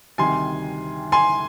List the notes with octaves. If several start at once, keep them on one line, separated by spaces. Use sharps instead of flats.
D2 C3 D#3 G3 G#5 C6
G#5 C6